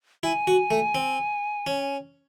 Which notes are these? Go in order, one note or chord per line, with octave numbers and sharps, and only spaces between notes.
E4 G#5
F#4
A3
C4
C#4